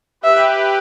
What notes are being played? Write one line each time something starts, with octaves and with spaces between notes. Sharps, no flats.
G4 B4 E5